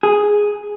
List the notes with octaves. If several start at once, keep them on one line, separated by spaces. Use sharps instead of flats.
G#4